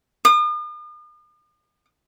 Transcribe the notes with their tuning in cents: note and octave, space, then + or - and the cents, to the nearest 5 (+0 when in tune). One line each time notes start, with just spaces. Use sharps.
D#6 -45